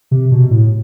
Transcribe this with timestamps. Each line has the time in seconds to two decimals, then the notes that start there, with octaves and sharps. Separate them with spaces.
0.11 C3
0.32 B2
0.51 A2